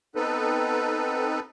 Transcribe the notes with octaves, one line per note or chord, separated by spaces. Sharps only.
B3 C4 D#4 A4 B4